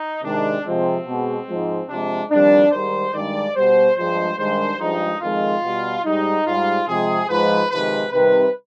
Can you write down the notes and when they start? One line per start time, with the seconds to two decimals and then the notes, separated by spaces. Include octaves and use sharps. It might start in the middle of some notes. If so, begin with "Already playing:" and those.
Already playing: D#4
0.23 C3 D#3 G#3 D4
0.65 C3 F3 G#3 C4
1.06 B2 G#3
1.48 G#2 F3 G#3
1.89 C3 F3 G#3 D4
2.31 F2 D#3 G3 D4
2.72 G#2 D#3 G3 C5
3.14 G2 D#3 G#3 D5
3.56 B2 G3 C5
3.97 G2 F3 G#3 C5
4.39 G2 D#3 G#3 C5
4.80 G2 F3 G#3 D#4
5.22 F2 D#3 G#3 F4
5.63 B2 G3
6.05 G#2 G3 D#4
6.46 G#2 G3 F4
6.88 C3 F3 G#3 G#4
7.29 G#2 F3 G#3 B4
7.71 F2 C3 D#3 G#3 B4
8.13 C3 D#3 G3 B4